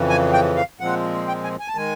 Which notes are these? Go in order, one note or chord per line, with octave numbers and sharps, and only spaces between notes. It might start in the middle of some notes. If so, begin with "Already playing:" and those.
Already playing: F2 C#3 E3
G#5
G5
F5
A#2 F3 G#3 C4 F#5
G5
G#5
G#5
A5
D#3 G#3 G#5